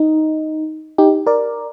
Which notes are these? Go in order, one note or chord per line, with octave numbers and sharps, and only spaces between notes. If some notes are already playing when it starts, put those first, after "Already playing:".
Already playing: D#4
D#4 G4
A#4 D5